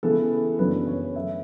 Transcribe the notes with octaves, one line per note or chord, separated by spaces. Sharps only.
C#3 E3 B3 A4
F#2 C#3 F#3 B3 D4 B4
C#5
D3 A3 C#4 E5